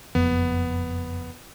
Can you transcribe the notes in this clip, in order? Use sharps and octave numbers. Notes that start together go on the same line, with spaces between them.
F#1 F2 B3